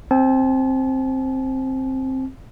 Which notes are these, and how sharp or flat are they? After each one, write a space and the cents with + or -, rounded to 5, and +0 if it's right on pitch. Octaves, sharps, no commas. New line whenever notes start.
C4 +10 A5 -40